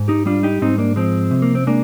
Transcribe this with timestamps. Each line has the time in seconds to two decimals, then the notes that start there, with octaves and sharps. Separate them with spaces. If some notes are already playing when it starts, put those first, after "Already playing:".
Already playing: G#2
0.08 D#4 G4
0.26 G3 D4 F4
0.43 D#4 G4
0.62 G#2 C4 D#4
0.78 A#3 D4
0.96 F3 G#3 C4
1.31 C3
1.42 A#3
1.55 C4
1.67 G#3 A#3 D4